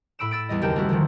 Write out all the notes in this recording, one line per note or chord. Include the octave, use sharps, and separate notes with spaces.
A2 B5 E6 D7 E7
E6 A6 D7
E2 G3 D#5
F#1 D#2 G4 G5 A5
A3 C#4 E4 F#4
D#2 D3 D#3 F3